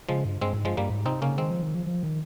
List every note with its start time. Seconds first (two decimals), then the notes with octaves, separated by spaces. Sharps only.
0.09 C#3 F3 G#3
0.25 G2
0.41 G2 G#3 C4
0.53 G#2
0.65 G2 F3 G#3
0.77 G2 G3 A#3
0.90 G#2
1.05 C3 C4 D#4
1.22 C#3 A#3 C#4
1.38 D#3 G#3 C4
1.50 F3
1.63 D#3
1.75 F3
1.86 F3
2.03 D#3